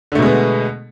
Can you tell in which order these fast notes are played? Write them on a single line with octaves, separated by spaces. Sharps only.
D3 A3 B2 G#3 B3